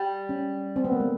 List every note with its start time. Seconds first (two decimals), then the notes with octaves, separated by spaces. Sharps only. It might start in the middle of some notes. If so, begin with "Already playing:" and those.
Already playing: G3
0.29 C#4
0.76 C4
0.84 B3
0.92 A#3
1.00 A3